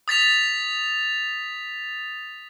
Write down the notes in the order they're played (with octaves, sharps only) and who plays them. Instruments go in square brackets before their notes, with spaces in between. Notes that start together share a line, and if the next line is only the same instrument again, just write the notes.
[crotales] D#6 A6 B6 F7